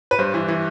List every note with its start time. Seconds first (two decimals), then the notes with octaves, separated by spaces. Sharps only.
0.11 B4
0.19 G2 C5
0.34 E3
0.48 E3